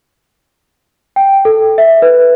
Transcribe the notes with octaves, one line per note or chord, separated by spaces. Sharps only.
G5
A4
E5
B4